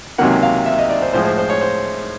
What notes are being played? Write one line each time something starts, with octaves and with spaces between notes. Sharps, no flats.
C#2 C3 D#3 F#3 A#3 F#5
F5
E5
D#5
D5
C5
A2 F3 G#3 C5
C5
C5
C#5
C5